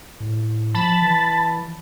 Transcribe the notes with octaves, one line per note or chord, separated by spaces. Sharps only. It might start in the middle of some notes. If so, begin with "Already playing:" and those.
A2
F3 A5 B5 A6
E3